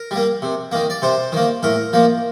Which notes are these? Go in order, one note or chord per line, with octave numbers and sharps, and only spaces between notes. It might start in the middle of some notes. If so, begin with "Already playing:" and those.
Already playing: A#4
G3 A#3
C3
D#3 A#3
D5
C3 C5
D#3 A#3
A2 A#4
F3 A#3